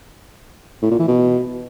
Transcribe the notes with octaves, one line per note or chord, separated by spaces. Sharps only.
A2
A#2
E3
B2